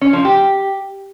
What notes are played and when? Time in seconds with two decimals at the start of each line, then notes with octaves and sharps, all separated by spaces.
0.01 C#4
0.13 F3
0.25 G4